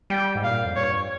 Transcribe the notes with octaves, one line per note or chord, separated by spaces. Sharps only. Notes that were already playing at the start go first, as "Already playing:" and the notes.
G3 G5
G#2
A#2 F5
F2
G2 C#5